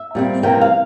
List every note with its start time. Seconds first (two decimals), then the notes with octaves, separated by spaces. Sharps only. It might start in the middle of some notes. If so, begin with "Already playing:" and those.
Already playing: E5
0.15 A#2 G3 C4
0.43 C3 E3 G3 A#3 G5
0.61 F5